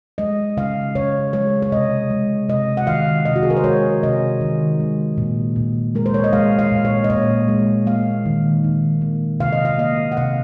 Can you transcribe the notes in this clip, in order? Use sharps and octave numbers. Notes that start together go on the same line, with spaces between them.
G#3 D#5
C#3 F5
C#3 C#5
G#3 C#5
C#5
C3 D#5
G#3
C3 D#5
F#5
D#3 F5
C3 D#5
F#4
G#4
A#4
C5
G#3 C#5
C3 D#5
D#3
G#3
A#2
A#2
G#3 A#4
C5
C#5
D#5
G#3 F5
F5
A#2
C#5
D#5
A#2 C#5
G#3
A#3 F5
D#3
D#3
A#3
C3 F5
D#5
F5
A#3 D#5
F#5
C3 F5